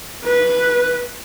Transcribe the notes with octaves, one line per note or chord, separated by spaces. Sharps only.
B4